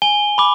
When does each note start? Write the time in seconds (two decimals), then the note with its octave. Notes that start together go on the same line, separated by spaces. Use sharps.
0.02 G#5 G7
0.38 B5 D6